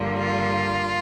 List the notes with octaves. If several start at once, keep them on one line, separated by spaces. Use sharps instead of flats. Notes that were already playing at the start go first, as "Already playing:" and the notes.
Already playing: G2 D3 F3 A#3
F4